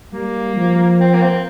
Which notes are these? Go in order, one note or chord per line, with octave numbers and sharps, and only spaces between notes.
G3 A#3
F3
C4
A#3
C4